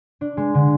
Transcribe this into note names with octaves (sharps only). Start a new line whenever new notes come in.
D4
G#3
D3